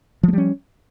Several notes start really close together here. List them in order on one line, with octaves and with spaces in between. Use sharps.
F3 A3 G3 C#4